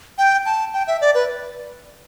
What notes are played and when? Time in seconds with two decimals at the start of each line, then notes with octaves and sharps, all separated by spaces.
0.18 G5
0.46 A5
0.73 G5
0.87 E5
1.01 D5
1.15 B4